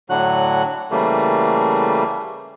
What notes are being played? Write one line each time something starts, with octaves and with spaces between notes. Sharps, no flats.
A2 D3 F#3 F#4 F#6
C#3 E3 G3 A3 A#3